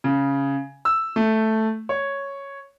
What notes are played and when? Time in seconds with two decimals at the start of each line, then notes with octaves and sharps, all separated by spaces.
0.04 C#3
0.85 E6
1.16 A3
1.89 C#5